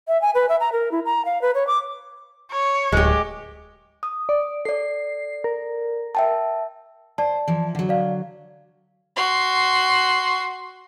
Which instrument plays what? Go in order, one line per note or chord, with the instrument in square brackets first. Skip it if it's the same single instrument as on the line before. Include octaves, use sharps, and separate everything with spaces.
[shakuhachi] E5
G#5
B4
E5
A#5
A#4
E4
A#5
F5
B4
C#5
D6
[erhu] C#5
[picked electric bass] D1 [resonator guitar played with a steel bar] G#3 G4
[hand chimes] D#6
[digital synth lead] D5
[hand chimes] A4 D5 [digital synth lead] C7
[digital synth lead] A#4
[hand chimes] E5 G5 A5
[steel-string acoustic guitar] C5 [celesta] D5 A5
[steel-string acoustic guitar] E3 F3
D3 F#3
[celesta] D5 F5
[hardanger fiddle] F#4 C6